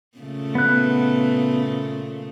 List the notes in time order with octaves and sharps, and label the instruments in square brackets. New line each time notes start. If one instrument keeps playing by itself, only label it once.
[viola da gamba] A#2 C#3 A3
[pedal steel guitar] B3 F#6